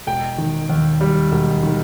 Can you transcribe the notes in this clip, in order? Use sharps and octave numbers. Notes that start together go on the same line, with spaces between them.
E1 G5
D#3
D#2
G3
E1
D#3